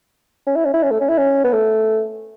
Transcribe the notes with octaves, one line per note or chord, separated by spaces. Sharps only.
C#4
E4
C#4
E4
C#4
A3
C#4
E4
C#4
B3
A3